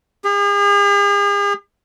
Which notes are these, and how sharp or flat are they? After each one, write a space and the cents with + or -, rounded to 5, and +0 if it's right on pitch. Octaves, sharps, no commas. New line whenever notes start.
G#4 -45